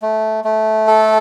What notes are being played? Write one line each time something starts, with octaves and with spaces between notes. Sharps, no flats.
A3
A3
A4